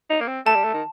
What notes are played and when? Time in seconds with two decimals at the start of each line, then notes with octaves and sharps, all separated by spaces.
0.10 D#4
0.21 A#3
0.27 C4
0.46 A3 A5
0.55 G3
0.64 A3
0.74 D#3